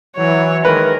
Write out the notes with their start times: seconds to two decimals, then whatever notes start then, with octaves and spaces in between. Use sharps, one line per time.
0.16 E3 F#3 C#5
0.65 D#3 E3 G#3 A#4 B4